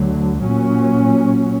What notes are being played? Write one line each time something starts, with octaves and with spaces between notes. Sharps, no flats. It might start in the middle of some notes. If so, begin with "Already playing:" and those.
Already playing: D2 D3 F#3
A#2 F#3 C#4